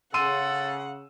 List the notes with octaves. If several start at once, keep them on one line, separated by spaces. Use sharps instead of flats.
C#3 A4 F#5 C6 E6 D#7